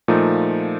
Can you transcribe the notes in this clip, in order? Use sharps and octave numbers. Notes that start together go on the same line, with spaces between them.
A#2 F3 A3 D#4